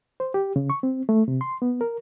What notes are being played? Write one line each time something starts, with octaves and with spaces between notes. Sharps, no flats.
C5
G4
C#3
C#6
C4
A3
C3
C6
B3
A#4